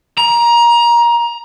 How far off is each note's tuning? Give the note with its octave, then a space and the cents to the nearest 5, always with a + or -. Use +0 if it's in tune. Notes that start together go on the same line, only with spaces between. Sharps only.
A#5 +20